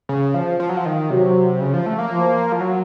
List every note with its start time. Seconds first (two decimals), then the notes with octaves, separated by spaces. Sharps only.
0.09 C#3
0.34 F3
0.60 F3
0.69 F#3
0.77 F3
0.86 D#3
1.10 C3 F#3
1.60 C#3
1.74 F3
1.86 A3
1.99 A#3
2.11 F3
2.52 F3
2.61 F#3